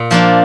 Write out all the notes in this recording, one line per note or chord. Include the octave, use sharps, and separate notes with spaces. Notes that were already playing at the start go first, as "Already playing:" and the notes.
Already playing: A#2
F3 A#3 D4